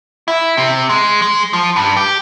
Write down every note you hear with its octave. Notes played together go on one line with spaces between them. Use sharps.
E4
C3
G#3
G#3
F3
G2
G4